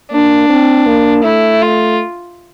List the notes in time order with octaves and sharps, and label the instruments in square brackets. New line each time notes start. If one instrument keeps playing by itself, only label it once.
[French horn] A#3 [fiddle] D4
[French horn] C4
A#3
[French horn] A3 [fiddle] E4
[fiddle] F4